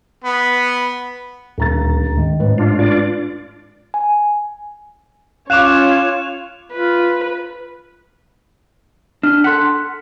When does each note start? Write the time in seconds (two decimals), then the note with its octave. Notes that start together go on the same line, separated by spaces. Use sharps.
0.24 B3
1.58 D#1 D2 A#5 A6
2.17 D#3
2.39 A1 G#2 B4
2.58 D4 F4
2.79 D4 F4 D5
3.94 G#5
5.50 C#4 F4 C#5 F5 D6 F#6 E7 F7
6.73 F4 B4
9.23 D4 F6
9.44 A4 F#5 C6 F#6 B6